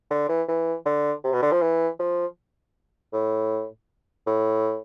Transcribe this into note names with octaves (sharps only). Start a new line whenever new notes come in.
D3
E3
E3
D3
C3
B2
D3
F3
E3
F3
A2
A2